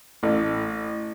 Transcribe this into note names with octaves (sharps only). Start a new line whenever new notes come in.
A1